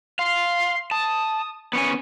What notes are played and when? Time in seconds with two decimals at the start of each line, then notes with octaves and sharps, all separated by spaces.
0.19 F5 C6
0.91 A5 D#6
1.73 B3 C#4 G#5 C#7